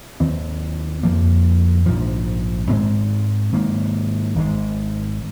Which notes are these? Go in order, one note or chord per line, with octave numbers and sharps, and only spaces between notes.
D#2 D#3 C4
F2 F3 A#3
A#1 G#2 F3
G#2 G#3 C4
G#2 D#3 A#3
G#1 G#2 G#3